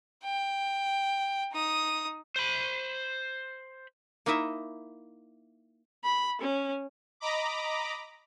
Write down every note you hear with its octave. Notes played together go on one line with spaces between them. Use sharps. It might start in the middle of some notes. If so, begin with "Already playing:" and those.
G5
D#4 D#6
C5 B5
A#3 D#4 E4 D#5 E5
B5
C#4
D#5 A#5 B5 D6